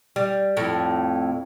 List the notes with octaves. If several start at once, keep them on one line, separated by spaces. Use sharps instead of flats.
G3
F2 A2